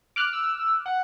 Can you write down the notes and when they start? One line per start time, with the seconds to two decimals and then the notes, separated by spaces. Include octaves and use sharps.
0.16 D6 F6 F#6
0.33 E6
0.86 F#5